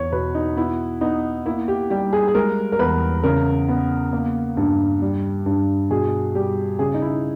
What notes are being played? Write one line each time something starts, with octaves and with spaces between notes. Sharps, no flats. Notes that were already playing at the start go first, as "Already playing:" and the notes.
Already playing: E2 C#5
B2 B4
D#4
B3 E4
B3 D#4
A#3 E4
G4
G3 G4
G#4
G#4
G#3 A#4
A#4
E2 B4
C#3 A#4
B3
A#3
G2
G3
G2
B2 G#4
G3 G4
C#3 G#4
D#4
E4